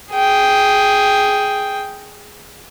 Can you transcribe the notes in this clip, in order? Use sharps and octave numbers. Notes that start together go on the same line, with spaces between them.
G#4 G5